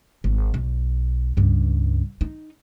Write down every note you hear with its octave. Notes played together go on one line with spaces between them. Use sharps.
G#1
B1
C#2 G2
D#4